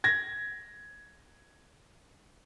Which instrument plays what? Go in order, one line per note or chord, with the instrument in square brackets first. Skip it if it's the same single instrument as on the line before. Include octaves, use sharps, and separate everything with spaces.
[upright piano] G#6 A#6